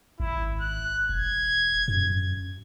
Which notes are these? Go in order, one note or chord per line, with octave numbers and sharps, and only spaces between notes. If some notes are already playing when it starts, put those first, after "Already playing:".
G#1 E4
F#6
E1 G#6
F#2